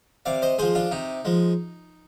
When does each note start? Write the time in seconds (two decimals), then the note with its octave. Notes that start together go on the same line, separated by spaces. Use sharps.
0.26 C3 D5 F5
0.42 C5 D#5
0.58 F3 G#3 G#4 C5
0.75 D4 F4
0.91 C3 D#4
1.25 F3 G#3